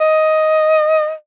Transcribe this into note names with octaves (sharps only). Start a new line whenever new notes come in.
D#5